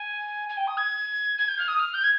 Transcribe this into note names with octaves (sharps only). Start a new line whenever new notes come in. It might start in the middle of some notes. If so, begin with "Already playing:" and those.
Already playing: G#5
G#5
G5
D#6
G#6
G#6
G6
F6
D#6
F6
G6
G#6